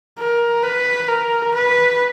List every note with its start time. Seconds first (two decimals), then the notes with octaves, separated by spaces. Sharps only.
0.19 A#4
0.63 B4
1.09 A#4
1.54 B4